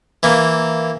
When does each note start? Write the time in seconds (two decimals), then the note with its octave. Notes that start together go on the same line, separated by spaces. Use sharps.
0.23 E3 A#3